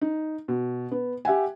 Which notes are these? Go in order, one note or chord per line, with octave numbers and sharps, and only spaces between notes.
D#4
B2
B3
G4 E5 F#5 G#5